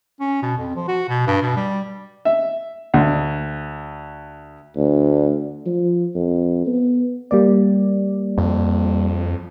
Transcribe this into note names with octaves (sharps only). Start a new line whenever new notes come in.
C#4
B2
F2
F3
F#4
B2
G2
B2
G3
E5
D2
D2
F3
F2
B3
G3 A#3 D5
F2